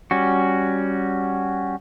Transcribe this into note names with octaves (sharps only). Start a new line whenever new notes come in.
G3 C#4 F#4